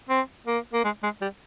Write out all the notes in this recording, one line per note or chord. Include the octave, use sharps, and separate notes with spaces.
C4
A#3
A#3
G#3
G#3
G3